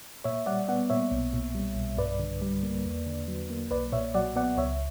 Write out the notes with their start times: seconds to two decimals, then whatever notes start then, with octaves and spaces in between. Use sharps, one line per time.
0.24 A#2 C#5 E5
0.46 G3 D5 F#5
0.68 B3 D5 F#5
0.90 A#2 C#5 E5
1.12 B1
1.33 A#2
1.55 G3
1.76 B1
1.98 G2 B4 D5
2.19 D3
2.42 G3
2.63 A#3
2.85 E2
3.07 D3
3.28 F#3
3.50 A#3
3.71 B1 B4 D5
3.92 A#2 C#5 E5
4.15 F#3 D5 F#5
4.36 B3 D5 F#5
4.58 C#2 C#5 E5